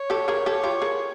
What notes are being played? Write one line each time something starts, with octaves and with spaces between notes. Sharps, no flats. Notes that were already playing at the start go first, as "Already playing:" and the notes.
Already playing: C#5
G4 A4
G#4 A#4
G4 A4
F4 G4
G#4 A#4